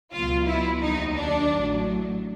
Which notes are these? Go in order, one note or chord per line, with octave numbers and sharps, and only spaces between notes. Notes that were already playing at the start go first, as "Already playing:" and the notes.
C#2 B2 F#3 F4
E4
D#2 D#3 F#3 D#4
D4
A1 A2 F#3